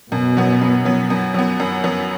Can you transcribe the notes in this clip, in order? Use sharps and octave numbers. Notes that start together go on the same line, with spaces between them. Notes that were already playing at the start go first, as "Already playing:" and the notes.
F#2 B2
F#3 B3
F#2
F#3 B3
F#2
F#3 B3
F#2
F#3 B3